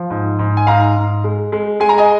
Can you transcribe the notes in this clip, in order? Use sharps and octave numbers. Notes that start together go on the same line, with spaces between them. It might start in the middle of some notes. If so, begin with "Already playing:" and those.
Already playing: F3
G#2
G#2
G#5
G#2 F5 A#5
G#2
G#3
G#3
G#3 G#5
A#5
D#5 G#5